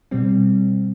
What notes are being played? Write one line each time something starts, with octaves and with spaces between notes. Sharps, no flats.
B2 G3 C4